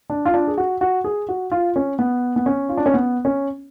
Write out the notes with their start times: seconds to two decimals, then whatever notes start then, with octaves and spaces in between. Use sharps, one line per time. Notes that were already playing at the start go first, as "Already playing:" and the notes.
0.10 D4
0.25 F4
0.34 D4
0.47 G#4
0.58 F#4
0.81 F#4
1.04 G#4
1.29 F#4
1.51 F4
1.76 C#4
1.99 B3
2.36 B3
2.46 C#4
2.69 F4
2.77 D4
2.86 C#4
2.94 B3
3.25 C#4